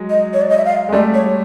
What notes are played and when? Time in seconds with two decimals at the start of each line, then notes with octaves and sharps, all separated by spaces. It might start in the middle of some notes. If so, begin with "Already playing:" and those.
Already playing: F#3 G#3
0.10 D#5
0.34 C#5
0.42 D5
0.49 D#5
0.57 E5
0.65 F5
0.89 G#3
0.92 G3 A3 D5
1.14 C#5